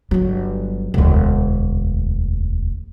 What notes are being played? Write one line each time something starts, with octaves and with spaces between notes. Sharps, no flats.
G1 F#3
E1 D2